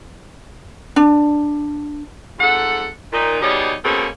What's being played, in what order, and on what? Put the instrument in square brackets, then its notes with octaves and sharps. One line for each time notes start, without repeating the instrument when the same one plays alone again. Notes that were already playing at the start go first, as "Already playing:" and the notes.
[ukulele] D4
[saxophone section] F2 G#2 A4 F#5
A#2 D#3 D#4
B2 G3 D#4 G#4 C#5 D5
B2 A3 A#3 C4 C#4 G#4